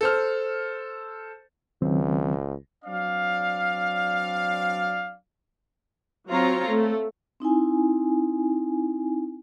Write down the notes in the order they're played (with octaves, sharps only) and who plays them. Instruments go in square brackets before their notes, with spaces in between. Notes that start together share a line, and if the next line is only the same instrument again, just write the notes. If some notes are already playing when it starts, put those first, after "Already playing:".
[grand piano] A4 C5 F6
[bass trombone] C#2 [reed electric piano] D#3 F#3 C4
[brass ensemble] F#3 C4 D4 D5 F5
[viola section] F#3 C4 F4 C#5 A#5
A3
[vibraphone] C4 D#4 E4 G#5